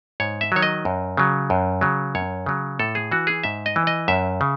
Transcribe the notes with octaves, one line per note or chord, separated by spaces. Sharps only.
G#2 C#5
E5
D#3 F#3 C#5
D#5
F#2
C#3 F#3
F#2
C#3 F#3
F#2 C#5
C#3 F#3
A2 A4
G#4
E3 F#4
G#4
G#2 E5
D#5
E3
D#5
F#2 E5
C#3